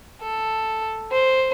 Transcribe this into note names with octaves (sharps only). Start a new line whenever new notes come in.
A4
C5